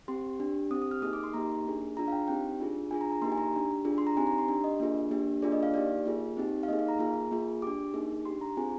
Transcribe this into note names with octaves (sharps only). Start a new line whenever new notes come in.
C4 G4 C6
D4 G4
C4 G4 D#6
D#6
F6
A#3 D#4 G#4 D#6
D6
C6
A#3 D#4 G4 A#5
A#3 D4 G#4
D4 F4 G#4 A#5
F5
G5
C4 D#4 G4 G5
D4 F4 G#4
D4 F4 G#4 G#5
A#5
A#5
A#3 D#4 G4 C6
G#5
A#5
D4 G4
D4 F4 G#4
C6
A#5
C4 D#4 G4 G#5
A#5
C6
D4 G4
D#5
A#3 D4 F4 G#4
A#3 D4 G4
A#3 D4 F4 G#4 D5
D#5
F5
A#3 D#4 G4 D5
A#3 F4 G#4
C4 D#4 G4
F5
A#3 D#4 G#4 D#5
F5
A#5
A#3 F4 G#4 A#5
A#3 F4 G#4
D4 G4 D6
A#3 D#4 G#4
D4 G4 C6
A#5
C4 F4 G#4 G#5